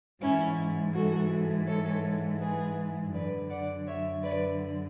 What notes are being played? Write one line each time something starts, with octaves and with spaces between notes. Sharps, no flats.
G#2 E3 C#4 E4
F#4 A4
A4 C#5
G#4 B4
F#2 D3 B4 D5
D5 F#5
C#5 E5
B4 D5